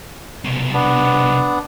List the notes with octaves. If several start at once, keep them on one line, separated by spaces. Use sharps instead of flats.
C2 B2
B3 D4